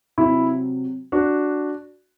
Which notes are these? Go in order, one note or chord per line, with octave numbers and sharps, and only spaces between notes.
C3 F#3 E4
D4 F#4